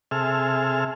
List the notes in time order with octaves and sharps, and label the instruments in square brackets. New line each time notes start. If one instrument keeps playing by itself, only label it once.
[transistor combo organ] C3 G#4 A4 E5 F6